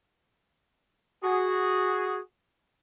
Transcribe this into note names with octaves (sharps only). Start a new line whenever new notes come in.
F#4 G#4